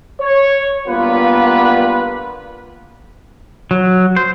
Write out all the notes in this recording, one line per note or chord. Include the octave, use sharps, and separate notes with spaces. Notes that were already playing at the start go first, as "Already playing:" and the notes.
C#5
G2 A#3 B3 F4 B4
F#3
C5